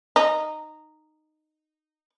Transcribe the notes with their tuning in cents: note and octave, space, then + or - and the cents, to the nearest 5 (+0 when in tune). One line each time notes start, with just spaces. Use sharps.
D#4 -10